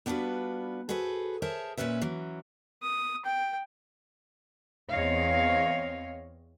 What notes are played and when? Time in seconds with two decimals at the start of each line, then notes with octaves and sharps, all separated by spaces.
0.06 G3 B3 D4 F4 F#4 B4
0.89 F#4 G#4 A4 B4 C5
1.42 G#4 A#4 C5 C#5 E5 A5
1.77 A#2 D#3 C#4 B4 E5
2.01 E3 F#3 C#4
2.82 D#6
3.25 G5
4.90 E2 C4 C#5 D#5 F5